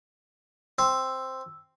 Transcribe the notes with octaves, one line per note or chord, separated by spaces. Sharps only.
C4 E6